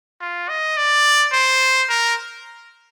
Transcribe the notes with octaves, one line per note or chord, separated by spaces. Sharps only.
F4
D#5
D5
C5
A#4